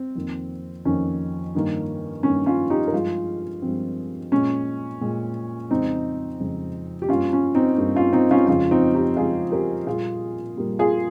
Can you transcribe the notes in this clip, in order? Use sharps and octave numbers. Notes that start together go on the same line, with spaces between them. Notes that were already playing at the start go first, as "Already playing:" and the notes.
Already playing: C4
F2 D#3 A#3
F2 D#3 A#3 C#4
G2 D#3 A#3
G2 D#3 A#3 C#4
C#4 F4
D#4 G4
A#4
G2 F3 G#3 F4 G#4
G2 F3 G#3 C4
A#2 G#3 C#4
A#2 G#3
F2 C#3 G#3 C4 D#4
F2 C#3 G#3
G4
G2 G3 A#3 C#4 F4
C#4
C4 D#4
G2 G3 A#3
C#4 F4
C4 D#4
C#4 F4
F2 C#3 G#3 C#4 F4
C4 D#4
D#4 G4
F2 C#3 G#3 F4 G#4
G4 A#4
A#2 G3 A#3 F4 G#4
A#2 G3 A#3
F4 G#4